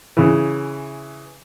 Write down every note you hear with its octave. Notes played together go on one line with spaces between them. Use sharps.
C#3 E3